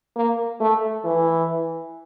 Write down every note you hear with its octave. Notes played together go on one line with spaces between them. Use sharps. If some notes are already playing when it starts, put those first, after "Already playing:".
A#3
A3
E3